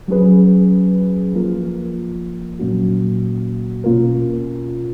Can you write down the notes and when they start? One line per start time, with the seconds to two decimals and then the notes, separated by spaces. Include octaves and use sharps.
0.08 F#3 C#4 G#4 B4
1.33 F3 A#3 F4 A#4
2.59 A#2 F#3 A#3 C#4 F#4
3.84 B2 A#3 C#4 F4 A#4